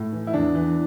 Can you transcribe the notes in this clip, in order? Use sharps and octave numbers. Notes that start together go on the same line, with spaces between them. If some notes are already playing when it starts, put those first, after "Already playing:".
Already playing: A2
E3
E4
E2 D4
E3